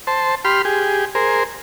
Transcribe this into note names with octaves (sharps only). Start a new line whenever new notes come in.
C5 A5
G4 B5 C6 F6
G4 G#4
G#4 A#4 C5